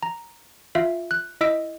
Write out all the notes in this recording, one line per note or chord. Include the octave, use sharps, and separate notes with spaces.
A#5
F4 E5 F5
F#6
E4 D#5 E6 B6 D7